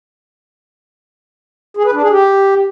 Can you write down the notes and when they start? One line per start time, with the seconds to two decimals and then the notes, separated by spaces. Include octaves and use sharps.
1.77 G#4
1.85 B4
1.94 D4
2.02 G#4
2.11 G4